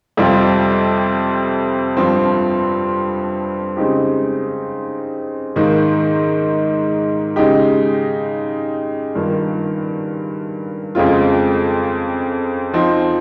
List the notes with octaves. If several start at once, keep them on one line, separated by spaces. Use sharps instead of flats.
F2 C3 G3 C4 F4
G2 F3 C4
C#3 G#3 C4 D#4 G4
G#2 D#3 A#3 D#4
C#3 G#3 D#4 G4
G2 D#3 A#3 F4
F2 C#3 G#3 C4 F4
F3 C4 D#4